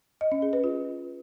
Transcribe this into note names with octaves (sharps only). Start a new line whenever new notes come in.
D#5
C#4
G#4
B4
F4